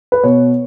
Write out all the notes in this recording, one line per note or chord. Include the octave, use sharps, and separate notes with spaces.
B4
B2 C#5